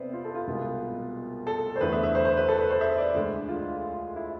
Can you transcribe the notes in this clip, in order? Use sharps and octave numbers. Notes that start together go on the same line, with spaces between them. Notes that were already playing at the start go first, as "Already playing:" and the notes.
Already playing: C3 B3 B4 C5 D5
F4
A4
F4
C2 B2 G#3 B3
A4
C5
E2 D3 A3 E4 B4
E5
E5
C5
C5
B4
A4
B4
C5
E5
D5
D2 D3 G#3
F4
E4